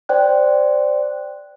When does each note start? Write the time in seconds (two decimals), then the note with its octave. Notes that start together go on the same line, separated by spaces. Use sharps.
0.09 C5 D5 G5 F#6